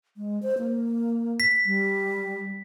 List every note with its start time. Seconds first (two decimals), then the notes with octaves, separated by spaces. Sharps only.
0.17 G#3
0.43 C5
0.58 A#3
1.40 B6
1.66 G3